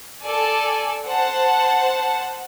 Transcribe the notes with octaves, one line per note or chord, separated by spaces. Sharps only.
A4 D5 G#5
C5 F#5 A5